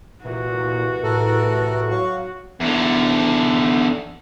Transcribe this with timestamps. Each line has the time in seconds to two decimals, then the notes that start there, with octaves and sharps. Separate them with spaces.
0.25 C2 A#2 E3 F#4
1.04 A2 A4 A#4
1.90 F#3 F5 C#6
2.60 E2 D3